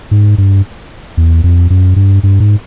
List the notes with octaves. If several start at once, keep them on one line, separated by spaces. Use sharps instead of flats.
G#2
G2
E2
F2
F#2
G2
G2
G#2